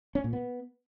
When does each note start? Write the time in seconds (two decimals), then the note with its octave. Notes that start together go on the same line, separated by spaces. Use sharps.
0.15 C#4
0.24 A#2
0.33 B3